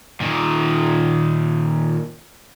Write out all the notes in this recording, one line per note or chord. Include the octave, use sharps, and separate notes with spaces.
A#2 D#3